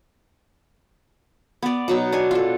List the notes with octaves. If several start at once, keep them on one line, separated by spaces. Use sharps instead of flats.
B3 D5
B2 F#3 D#4
D4 C#5 G#5
F4 A4